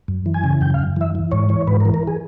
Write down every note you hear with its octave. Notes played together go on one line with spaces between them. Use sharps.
F#2
E3
G#5
C#3
F#2 G5
F5
F#2
E3 E5
E3
G#2 C#5
E3 C#5
G#2 B4
A#4
E3
A#4
G#4